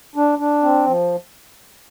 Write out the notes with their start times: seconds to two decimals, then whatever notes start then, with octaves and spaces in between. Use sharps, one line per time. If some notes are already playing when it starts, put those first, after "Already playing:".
0.16 D4
0.39 D4
0.63 C4
0.86 F3